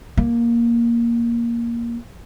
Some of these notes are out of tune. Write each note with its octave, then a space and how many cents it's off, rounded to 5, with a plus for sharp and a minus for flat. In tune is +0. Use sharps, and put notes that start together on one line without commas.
A#3 +5